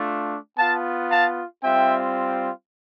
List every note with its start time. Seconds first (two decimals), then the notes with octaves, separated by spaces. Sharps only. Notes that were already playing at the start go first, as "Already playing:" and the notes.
Already playing: A3 D4 F4
0.58 B3 F4 F5 A5
1.11 F5 A5
1.64 G3 C4 F4 E5 G5